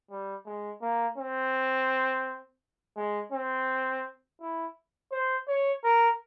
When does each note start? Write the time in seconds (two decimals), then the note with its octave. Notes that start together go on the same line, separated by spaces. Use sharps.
0.10 G3
0.46 G#3
0.82 A#3
1.17 C4
2.96 G#3
3.32 C4
4.41 E4
5.11 C5
5.47 C#5
5.84 A#4